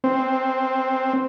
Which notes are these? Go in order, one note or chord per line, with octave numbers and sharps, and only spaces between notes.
C4